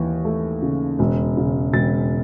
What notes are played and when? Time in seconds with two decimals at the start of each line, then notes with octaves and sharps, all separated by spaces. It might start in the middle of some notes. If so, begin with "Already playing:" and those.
Already playing: D#2 E3
0.25 A3
0.62 C#3
0.99 E1
1.37 C#3
1.73 E1 A6